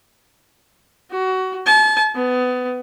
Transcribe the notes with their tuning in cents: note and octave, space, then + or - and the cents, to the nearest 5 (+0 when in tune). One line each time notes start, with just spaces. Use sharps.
F#4 +20
A5 -35
B3 +25